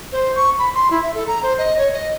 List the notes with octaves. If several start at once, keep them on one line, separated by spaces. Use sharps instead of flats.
C5
C#6
B5
C6
E4
E5
A4
A#5
C5
D#5
C#5
D#5